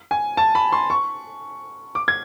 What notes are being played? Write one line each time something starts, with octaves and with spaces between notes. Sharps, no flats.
G#5
A5
B5
C6
C#6
D6
G#6